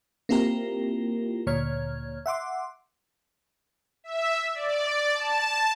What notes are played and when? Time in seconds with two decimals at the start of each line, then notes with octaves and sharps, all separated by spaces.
0.29 A#3 C4 E4 F4 G4 A#4
1.47 D2 A#2 C#5 F6 G#6
2.26 E5 F#5 C6 D6
4.04 E5
4.55 D5
5.14 A5